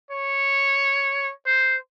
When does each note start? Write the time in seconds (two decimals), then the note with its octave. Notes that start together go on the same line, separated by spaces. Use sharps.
0.11 C#5
1.46 C5